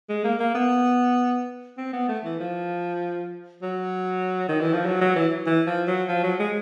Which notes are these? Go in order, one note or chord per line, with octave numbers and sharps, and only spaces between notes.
G#3
A#3
A#3
B3
C4
B3
A3
E3
F3
F#3
D#3
E3
F3
F#3
F#3
E3
E3
F3
F#3
F3
F#3
G#3